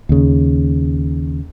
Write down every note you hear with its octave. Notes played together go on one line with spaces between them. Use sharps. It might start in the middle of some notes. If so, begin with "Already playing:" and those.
D#2 C#3